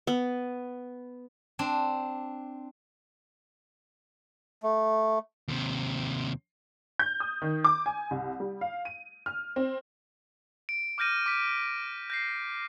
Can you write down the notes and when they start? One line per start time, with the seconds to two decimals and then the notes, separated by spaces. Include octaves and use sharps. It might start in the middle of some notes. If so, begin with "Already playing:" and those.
0.07 B3
1.59 C4 D4
4.63 A3
5.48 D#2 C3
6.99 G6
7.20 D#6
7.42 D#3
7.64 D6
7.86 G#5
8.11 C2
8.40 G3
8.61 F5
8.85 D#7
9.26 F6
9.56 C4
10.69 D7
10.98 D6 F6 G6 A#6 D#7
11.26 D6 B6
12.10 G6 A#6 C7